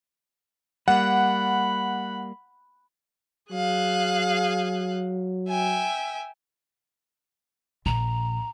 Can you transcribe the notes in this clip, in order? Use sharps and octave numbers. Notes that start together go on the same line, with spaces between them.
G3 A#3 F#5 B5
F#3 G#4 F5 F#6
E5 G5 G#5
A#1 A#5